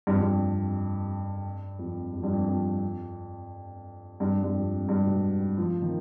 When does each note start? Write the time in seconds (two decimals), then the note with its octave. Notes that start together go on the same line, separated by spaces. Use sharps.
0.07 G2
0.14 F2
0.21 G2
1.79 F2
2.13 F2
2.23 G2
2.33 F2
2.48 F2
4.20 G2
4.43 G2
4.54 F2
4.82 G#2
4.89 G2
5.06 B2
5.57 F3
5.82 D#3